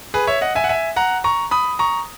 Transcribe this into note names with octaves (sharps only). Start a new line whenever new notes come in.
G#4 B4
C#5 E5
D#5 F#5
E5 G#5
F#5
E5 G#5
F#5 A#5
A#5 C#6
B5 D#6
A#5 C#6